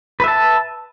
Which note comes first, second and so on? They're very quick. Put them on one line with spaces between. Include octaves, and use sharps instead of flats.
B4 E5 A5